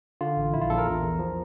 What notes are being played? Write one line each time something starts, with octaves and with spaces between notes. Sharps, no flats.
D3 F4
A1
A#1 E4
F4
A#1 A4
A#4
E2
E2
F3